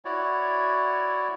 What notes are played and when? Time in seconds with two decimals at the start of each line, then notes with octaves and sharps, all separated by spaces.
0.05 E4 F#4 C#5 D5